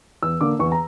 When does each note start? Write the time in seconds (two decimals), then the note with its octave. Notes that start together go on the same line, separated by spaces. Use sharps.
0.22 E2 E6
0.41 D3 A#3 D6
0.59 E2 C#6
0.72 A#5